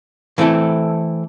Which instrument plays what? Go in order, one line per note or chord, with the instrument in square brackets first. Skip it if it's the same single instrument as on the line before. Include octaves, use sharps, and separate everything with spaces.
[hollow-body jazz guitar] E3 A3 C4 E4 A4